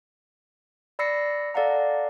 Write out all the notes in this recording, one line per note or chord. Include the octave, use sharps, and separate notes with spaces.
D5 B5 E6 A#6 C7 C#7
A4 D5 F5 F#5 A#5